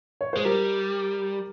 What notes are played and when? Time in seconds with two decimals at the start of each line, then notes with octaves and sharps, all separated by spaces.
0.21 C#5
0.33 G#3 C5
0.45 G3 G4 A#4